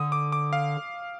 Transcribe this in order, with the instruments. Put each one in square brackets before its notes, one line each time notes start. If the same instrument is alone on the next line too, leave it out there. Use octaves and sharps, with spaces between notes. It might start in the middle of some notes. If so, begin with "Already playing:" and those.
Already playing: [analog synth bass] D3 [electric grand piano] D#6
[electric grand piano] D6
D6
F5